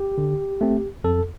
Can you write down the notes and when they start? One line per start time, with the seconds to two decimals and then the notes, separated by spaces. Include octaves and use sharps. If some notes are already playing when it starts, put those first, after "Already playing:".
Already playing: G4
0.18 D3
0.61 A3 C4
1.04 F2 A4